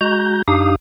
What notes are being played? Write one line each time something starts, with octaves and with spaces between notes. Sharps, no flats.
G#3 F#4 A#5 G6
F#2 D4 D#4 G4 F5 D#6